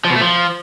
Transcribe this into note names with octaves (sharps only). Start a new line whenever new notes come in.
F3
B2
A3
F3